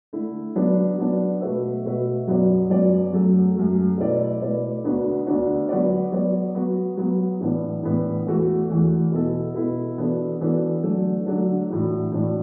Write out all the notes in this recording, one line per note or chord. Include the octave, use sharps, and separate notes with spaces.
D3 A3 E4
F#3 B3 D4
F#3 B3 D4
B2 A3 F#4 B4 E5
B2 A3 F#4 B4 E5
F#2 F#3 B3 F#4 D5
F#2 F#3 B3 F#4 D5
F#2 F#3 A3
F#2 F#3 A3
B2 A3 E4 B4 D5
B2 A3 E4 B4 D5
D2 D3 B3 D4 F#4
D2 D3 B3 D4 F#4
F#3 B3 F#4 D5
F#3 B3 F#4 D5
F#3 B3 F#4
F#3 B3 F#4
A2 E3 B3 D4
A2 E3 B3 D4
E2 E3 A3 F#4
E2 E3 A3 F#4
B2 B3 E4 A4
B2 B3 E4 A4
E3 B3 D4 F#4 A4
E3 B3 D4 F#4 A4
D3 F#3 A3 D4
D3 F#3 A3 D4
A2 E3 D4 F#4
A2 E3 D4 F#4